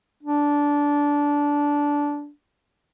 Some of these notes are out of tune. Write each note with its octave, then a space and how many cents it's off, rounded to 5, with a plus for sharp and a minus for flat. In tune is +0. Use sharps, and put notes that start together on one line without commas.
D4 -15